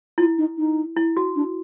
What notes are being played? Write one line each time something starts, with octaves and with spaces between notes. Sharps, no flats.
E4 F4
D#4
D#4
E4
F#4
D4